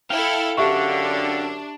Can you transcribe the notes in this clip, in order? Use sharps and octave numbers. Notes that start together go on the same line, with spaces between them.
E4 A4 F5 G5
F#2 D3 D4 G4 E5 C#6